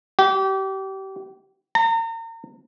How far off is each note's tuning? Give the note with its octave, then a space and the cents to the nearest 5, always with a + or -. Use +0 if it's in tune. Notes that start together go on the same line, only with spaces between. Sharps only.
G4 -30
A#5 -35